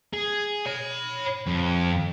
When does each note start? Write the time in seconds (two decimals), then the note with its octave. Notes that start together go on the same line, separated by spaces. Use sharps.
0.13 G#4
0.66 C#5 B5
1.48 F2